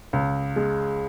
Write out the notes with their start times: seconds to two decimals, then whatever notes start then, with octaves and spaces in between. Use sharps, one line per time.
0.13 C#2
0.56 G#3